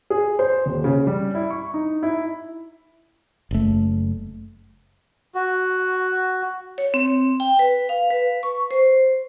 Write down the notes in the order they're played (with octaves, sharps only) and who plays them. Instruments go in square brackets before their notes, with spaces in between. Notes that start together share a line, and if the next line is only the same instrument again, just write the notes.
[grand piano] G#4
C5
D#1
C#3
G3
E4
C#6
D#4
E4
[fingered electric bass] F#1 A3
[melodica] F#4
[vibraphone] C#5
C4
G5
B4
F5
B4
C#6
C5